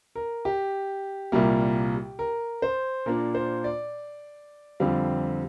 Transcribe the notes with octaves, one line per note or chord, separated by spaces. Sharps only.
A#4
G4
C2 A#2 G3 A#3
A#4
C5
A#2 A#3 D4 A#4
C5
D5
F2 D3 G3 C4 F5